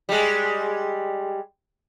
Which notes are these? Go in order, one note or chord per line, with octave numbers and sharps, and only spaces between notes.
G3 G#3